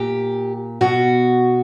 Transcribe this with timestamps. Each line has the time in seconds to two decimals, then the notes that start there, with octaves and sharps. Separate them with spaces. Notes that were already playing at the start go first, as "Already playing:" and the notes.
Already playing: A#2 G4
0.81 B2 F#4